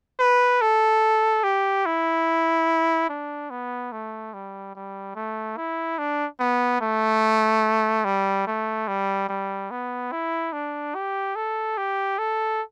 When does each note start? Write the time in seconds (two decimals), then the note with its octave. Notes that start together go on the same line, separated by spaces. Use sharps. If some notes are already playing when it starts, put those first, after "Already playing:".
0.20 B4
0.61 A4
1.44 G4
1.86 E4
3.09 D4
3.50 B3
3.92 A3
4.34 G3
4.75 G3
5.15 A3
5.57 E4
5.98 D4
6.40 B3
6.81 A3
8.05 G3
8.47 A3
8.88 G3
9.29 G3
9.71 B3
10.12 E4
10.53 D4
10.95 G4
11.36 A4
11.78 G4
12.19 A4